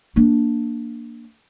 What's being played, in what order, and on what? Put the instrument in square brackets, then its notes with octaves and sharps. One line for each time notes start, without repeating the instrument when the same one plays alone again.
[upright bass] A#3 D4